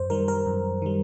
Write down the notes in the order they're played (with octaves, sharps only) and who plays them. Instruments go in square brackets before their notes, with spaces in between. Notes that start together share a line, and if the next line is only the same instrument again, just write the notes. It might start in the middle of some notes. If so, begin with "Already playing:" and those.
Already playing: [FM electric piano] F#2 C5
D#3 G3 A#4
A#4
F#2
D#3 G3